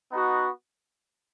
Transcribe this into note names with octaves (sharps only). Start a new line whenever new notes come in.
B3 D#4 F#4